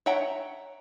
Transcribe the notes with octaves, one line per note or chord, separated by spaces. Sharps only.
C#5 E5 F#5 G5 A#5